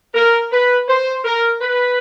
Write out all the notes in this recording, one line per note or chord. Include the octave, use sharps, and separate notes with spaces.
A#4
B4
C5
A#4
B4